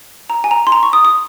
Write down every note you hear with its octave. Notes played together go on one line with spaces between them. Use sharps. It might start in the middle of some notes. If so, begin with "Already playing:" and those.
A#5
G#5
A#5
C6
A#5
C#6
D#6
D#6